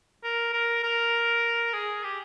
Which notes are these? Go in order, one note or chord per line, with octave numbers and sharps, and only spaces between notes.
A#4
A#4
A#4
G#4
G4